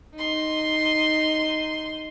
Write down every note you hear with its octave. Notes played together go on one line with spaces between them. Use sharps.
D#4 C6